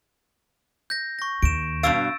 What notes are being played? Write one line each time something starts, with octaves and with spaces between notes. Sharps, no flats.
G6 A#6
C#6 A#6
D#2 D7 E7
G2 B2 F5 E6 A6 D7